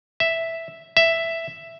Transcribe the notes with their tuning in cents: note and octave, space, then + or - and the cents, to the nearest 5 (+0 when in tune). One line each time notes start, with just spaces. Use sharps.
E5 +0
E5 +5